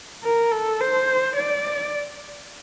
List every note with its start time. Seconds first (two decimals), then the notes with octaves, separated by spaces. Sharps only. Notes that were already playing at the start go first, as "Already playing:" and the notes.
0.24 A#4
0.52 A4
0.80 C5
1.36 D5